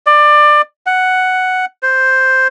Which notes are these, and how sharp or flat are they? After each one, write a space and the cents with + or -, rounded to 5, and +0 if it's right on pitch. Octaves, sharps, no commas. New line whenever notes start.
D5 +20
F#5 +5
C5 +0